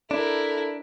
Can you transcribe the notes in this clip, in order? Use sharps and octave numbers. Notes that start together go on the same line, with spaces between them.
D4 E4 A4 A#4